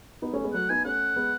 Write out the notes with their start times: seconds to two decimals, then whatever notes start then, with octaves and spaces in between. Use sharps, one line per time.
0.22 B3 D#4
0.33 A3 C#4
0.43 G#3 B3
0.53 F#3 A3 F#5
0.69 B3 D#4 G#5
0.85 A3 C#4 F#5
1.16 G#3 B3